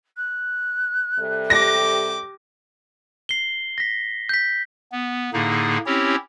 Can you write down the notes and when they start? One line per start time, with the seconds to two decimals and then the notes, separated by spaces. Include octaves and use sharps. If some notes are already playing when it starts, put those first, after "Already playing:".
0.16 F#6
1.19 C3 G3 A4
1.50 G4 D6 A#6
3.29 C7 G7
3.78 A#6 B6
4.29 G6 B6
4.92 B3
5.33 A2 D3 A#3 D#4 G#4
5.86 C4 C#4 E4 G4 C#5